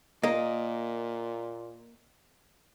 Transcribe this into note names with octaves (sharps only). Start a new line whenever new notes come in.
A#2 A#3 D#5